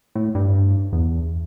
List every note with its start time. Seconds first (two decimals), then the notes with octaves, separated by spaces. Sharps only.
0.15 A2
0.35 G2
0.93 E2